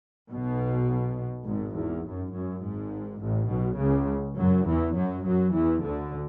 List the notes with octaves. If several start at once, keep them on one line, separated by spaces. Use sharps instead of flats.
B1 B2
G#1 G#2
E2
F#2
F#2
G#1 G#2
A1 A2
B1 B2
C#2 C#3
F#2 F#3
E2 E3
F#2 F#3
F#2 F#3
E2 E3
D2 D3